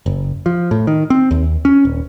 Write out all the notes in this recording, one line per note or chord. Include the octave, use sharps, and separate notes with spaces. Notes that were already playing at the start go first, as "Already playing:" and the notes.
F#1
F3
A2
D#3
C4
D#2
C#4
D#1